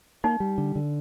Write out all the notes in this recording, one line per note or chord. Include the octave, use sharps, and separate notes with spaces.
A#3 D#4
G3
D3
D3